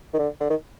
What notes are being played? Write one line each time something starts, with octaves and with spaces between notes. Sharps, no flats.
D#3
D3
D3
D#3